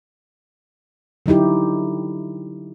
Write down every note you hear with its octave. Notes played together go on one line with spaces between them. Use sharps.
D3 F#3 D#4 E4 G4